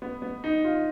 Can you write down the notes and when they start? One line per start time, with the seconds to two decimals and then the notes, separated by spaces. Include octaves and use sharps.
0.02 B3
0.22 B3
0.44 D#4
0.64 F4